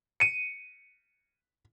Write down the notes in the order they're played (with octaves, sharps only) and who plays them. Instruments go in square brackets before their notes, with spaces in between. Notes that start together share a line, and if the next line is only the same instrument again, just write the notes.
[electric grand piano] C#7 D#7